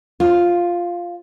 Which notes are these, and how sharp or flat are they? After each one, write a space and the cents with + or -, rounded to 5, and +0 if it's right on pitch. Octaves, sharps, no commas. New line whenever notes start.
F4 +0 C5 +30